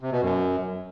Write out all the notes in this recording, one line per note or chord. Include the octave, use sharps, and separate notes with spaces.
C3
B2
F#2